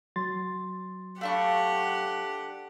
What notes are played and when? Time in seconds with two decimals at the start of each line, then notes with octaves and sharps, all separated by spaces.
0.16 F#3 C6 A6
1.21 A3 D4 G4 F5 F#5 B5 C#6